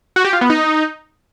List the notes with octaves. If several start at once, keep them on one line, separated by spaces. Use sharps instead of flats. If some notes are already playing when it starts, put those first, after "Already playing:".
F#4
G4
F4
B3
D#4